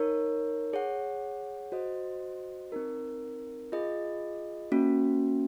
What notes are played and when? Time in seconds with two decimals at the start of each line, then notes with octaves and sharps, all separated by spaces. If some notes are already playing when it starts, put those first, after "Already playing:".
Already playing: D#4 A#4 C#5
0.73 G#4 C#5 F#5
1.72 F#4 C5 D#5
2.72 C4 D#4 A#4
3.72 F4 G#4 D#5
4.72 A#3 C#4 F#4